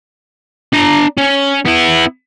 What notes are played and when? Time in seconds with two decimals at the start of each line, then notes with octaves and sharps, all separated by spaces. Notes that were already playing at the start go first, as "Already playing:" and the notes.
0.73 D4 A#5
1.18 C#4
1.66 B3 E4